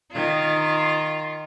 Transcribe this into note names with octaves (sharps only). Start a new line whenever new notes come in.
D#3 F4